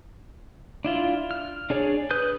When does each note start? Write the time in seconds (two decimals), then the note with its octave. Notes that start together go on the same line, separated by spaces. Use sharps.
0.85 D4 E4 F4
1.31 F6
1.70 D4 G#4 C#5 D5
2.11 B4 D#6 F#6 G6